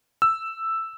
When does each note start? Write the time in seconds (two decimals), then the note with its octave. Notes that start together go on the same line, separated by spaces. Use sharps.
0.22 E6